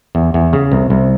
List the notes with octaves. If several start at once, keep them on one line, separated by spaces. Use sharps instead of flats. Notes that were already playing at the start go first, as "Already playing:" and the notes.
E2
E2
C#3
C2
C2